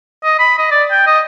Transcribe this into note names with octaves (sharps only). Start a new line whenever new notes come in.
D#5
B5
D#5
D5
G5
D#5